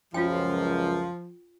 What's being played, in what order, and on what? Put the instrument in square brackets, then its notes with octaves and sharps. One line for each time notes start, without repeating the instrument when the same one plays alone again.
[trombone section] C#2 F#2 [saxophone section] F3 [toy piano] F4 G5